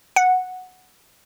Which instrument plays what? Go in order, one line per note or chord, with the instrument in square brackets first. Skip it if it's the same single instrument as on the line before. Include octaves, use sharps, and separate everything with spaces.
[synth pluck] F#5